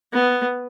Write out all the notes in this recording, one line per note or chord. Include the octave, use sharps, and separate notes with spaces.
B3